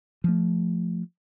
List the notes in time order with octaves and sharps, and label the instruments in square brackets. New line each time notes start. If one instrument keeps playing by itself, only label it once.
[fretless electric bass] F3 A3